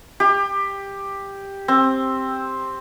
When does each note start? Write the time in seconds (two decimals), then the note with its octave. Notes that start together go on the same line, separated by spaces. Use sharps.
0.20 G4
1.68 C4